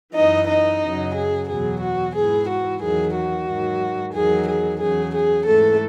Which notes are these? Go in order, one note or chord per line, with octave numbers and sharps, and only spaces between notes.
F#2 E3 D#4 D#5
D#4 D#5
F#2 C#3 F#3
G#4
E2 B2 F#3 G#4
F#4
G#2 E3 G#4
F#4
E2 D#3 F#3 G#4
F#4
G#2 D#3 F#3
E2 D#3 F#3 G#4
G#4
E2 C#3 F#3 G#4
G#4
G#2 E3 A3 A4